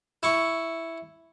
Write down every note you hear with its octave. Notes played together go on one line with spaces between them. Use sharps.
E4 C#6